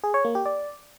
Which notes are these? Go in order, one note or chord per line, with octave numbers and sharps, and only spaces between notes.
G#4
C#5
A#3
G4
D5